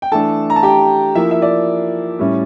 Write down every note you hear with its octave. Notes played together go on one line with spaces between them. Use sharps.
G5
E3 A3 D4 A4 A5
A#5
A5
G4 G5
F3 A#3 E4 E5
E5
D5
A2 G3 C#4 E4